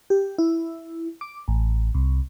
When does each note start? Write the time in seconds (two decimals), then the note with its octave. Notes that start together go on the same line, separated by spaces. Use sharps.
0.10 G4
0.38 E4
1.21 D6
1.48 A1
1.95 C2